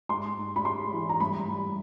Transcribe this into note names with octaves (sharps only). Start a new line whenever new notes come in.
G#2 C6
G#2
B5
G#3 C6
E3
A#5
G2 B5
G2